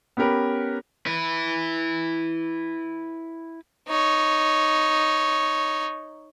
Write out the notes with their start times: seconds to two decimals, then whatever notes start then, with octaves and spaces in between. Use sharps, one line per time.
0.17 B3 C#4 G4 A#4 B4
1.06 E4 B4
3.88 D#4 C#5